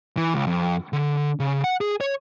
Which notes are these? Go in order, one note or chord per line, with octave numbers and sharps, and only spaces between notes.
E3
C#2
F2
D3
C#3
F#5
G#4
C#5